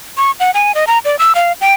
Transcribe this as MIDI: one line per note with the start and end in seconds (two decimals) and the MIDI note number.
0.17 0.31 85
0.40 0.51 78
0.54 0.75 80
0.75 0.85 75
0.87 0.99 82
1.05 1.16 74
1.19 1.33 88
1.35 1.52 77
1.61 1.74 79